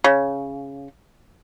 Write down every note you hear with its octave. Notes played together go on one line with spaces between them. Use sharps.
C#3